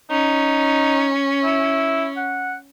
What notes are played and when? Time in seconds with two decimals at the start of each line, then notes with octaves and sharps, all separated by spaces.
0.10 C#4 D#4
1.44 E4
2.16 F#5